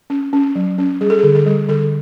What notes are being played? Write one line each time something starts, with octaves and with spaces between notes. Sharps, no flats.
C#4
C#4
F#3
C#4
G3 G#4
A4
D3 G#4
A4
G3
D3 A4